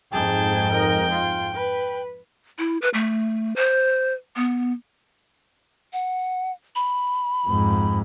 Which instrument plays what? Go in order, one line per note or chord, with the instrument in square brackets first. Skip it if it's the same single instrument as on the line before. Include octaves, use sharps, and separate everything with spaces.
[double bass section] F2 G#2 [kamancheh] G#4 A5 [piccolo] G5
[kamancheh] A#4 D#5
F4
B4
[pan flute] E4
B4
A3
C5
B3
F#5
B5
[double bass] F2 G#2